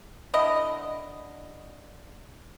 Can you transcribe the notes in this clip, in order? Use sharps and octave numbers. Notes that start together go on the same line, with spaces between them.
D3 E4 D#5